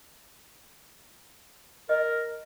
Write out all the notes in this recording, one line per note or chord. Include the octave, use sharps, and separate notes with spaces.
A#4 D#5